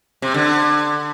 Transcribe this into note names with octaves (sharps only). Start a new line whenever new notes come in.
C3
D3